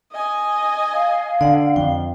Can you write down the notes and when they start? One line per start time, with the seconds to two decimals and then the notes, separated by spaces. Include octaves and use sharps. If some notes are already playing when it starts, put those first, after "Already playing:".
0.12 D#5 G#5
0.93 F5
1.41 D3 D5 F#5
1.76 F2 G5